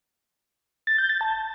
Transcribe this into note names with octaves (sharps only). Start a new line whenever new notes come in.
A6
G6
A6
A5